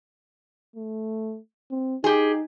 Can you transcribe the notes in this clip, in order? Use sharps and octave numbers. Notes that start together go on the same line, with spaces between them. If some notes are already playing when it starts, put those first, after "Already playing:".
A3
C4
D#4 G4 G#4